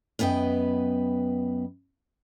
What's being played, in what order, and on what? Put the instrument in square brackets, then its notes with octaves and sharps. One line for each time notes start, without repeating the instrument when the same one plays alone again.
[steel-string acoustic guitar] F#2 B3 B4 D#5 G5